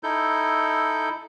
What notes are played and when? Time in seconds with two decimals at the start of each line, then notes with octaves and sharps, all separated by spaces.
0.03 D#4 E4 A4 G6